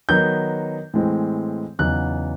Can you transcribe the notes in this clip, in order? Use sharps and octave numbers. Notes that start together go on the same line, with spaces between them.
D#3 F#3 B3 D#4 G6
A2 E3 G#3 C4
E2 C#3 F#3 B3 D#4 F#6